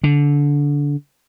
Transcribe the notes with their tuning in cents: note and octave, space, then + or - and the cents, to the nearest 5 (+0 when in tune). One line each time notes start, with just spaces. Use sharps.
D3 -20